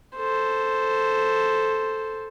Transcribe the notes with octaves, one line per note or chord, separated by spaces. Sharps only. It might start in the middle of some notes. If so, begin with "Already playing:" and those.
A4 C5